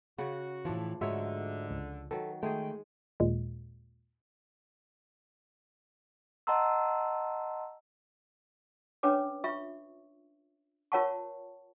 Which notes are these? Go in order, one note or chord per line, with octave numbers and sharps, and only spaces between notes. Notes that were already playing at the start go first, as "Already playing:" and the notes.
C#3 F#4 F#5
A2 E3 F3 D4
G#2 D3 G#3 A3 F#4 C#5 E5
C#2
D#3 F#3 A4 B4
D#3 G#3 A3 G#4 G5
D#2 A#2 G#3
D#5 F#5 A5 A#5 C6 E6
C#4 D4 B4 C#5 D6
F4 E5 C#6
F4 A#4 C#5 F#5 A5 C#6